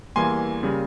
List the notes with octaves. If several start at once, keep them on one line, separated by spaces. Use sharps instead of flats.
E2 E3 G3 A#3 G#5 C6
C#3 G3 A#3